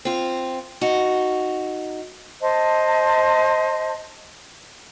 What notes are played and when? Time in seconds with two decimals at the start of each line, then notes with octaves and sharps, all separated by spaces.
0.05 C4 F4
0.81 D#4 F#4
2.42 C5 D#5 A5